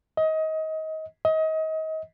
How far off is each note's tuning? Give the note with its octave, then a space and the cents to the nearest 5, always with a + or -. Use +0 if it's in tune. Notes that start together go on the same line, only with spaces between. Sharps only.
D#5 +25
D#5 +30